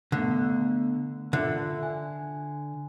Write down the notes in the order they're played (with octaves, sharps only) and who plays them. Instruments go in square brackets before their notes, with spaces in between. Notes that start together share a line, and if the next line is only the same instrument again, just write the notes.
[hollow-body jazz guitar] D3 [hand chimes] A3 B3
[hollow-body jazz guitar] D3 [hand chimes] F4 E5
[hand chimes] G#5